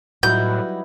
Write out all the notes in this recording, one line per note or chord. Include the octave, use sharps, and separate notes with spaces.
A2 F#3 G3 D#4 E4 F#4 B4 G6